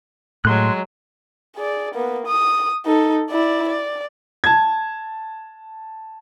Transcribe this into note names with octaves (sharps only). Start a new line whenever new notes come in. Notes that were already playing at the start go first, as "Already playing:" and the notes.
A2 F#3 G#3 C6 F#6
G#4 D5
A#3 B3
D#6
D#4 A4
E4 D5
D5
A5 G#6